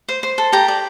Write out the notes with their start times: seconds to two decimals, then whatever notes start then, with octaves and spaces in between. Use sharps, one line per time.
0.09 C5
0.23 C5
0.38 A4
0.52 G4 G5 A#5
0.68 D5